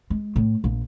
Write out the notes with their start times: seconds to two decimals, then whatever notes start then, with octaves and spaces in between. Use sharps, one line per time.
0.10 G#3
0.36 A2
0.64 A#1